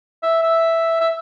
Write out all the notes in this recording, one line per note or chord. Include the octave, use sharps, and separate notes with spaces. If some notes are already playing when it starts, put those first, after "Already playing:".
E5
E5
E5